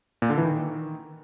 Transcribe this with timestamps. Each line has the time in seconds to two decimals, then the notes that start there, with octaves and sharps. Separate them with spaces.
0.22 A#2
0.30 D3
0.37 E3
0.45 D#3